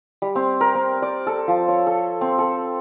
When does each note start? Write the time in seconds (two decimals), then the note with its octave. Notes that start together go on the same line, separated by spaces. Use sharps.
0.22 G3
0.35 C4
0.61 A#4
0.75 C4
1.02 D5
1.27 A4
1.48 F3
1.68 C#5
1.87 A4
2.21 C4
2.39 A4